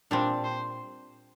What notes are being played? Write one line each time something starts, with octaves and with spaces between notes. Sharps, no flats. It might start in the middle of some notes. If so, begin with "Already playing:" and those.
A#2 G3 C4 D4
C5